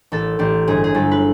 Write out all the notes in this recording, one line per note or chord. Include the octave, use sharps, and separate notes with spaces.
A1 A4
A1 G4
G1 G#4
G#4
G1 A4
B4